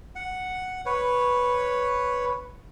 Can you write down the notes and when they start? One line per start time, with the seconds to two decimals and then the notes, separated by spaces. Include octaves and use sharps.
0.15 F#5
0.86 B4 C#5